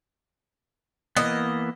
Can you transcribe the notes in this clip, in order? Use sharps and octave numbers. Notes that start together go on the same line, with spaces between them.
E3 A#3 B3 D#5